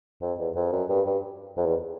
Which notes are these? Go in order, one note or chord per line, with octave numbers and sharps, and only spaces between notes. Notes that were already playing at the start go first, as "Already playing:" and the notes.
F2
E2
F2
F#2
G2
G2
F2
E2